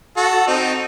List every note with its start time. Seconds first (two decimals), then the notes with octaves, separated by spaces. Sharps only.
0.17 F#4 A4
0.47 C4 D#4